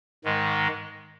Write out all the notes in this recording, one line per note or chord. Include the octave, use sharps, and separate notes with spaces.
G#2 D#3 G#3